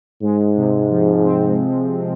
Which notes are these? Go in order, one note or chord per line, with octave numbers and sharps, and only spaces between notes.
G#2 G#3
C3
F3
C4